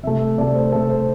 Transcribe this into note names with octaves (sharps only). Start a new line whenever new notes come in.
C3 A3 E5
C3 A3 D5
C5
C3 A3 A4
C5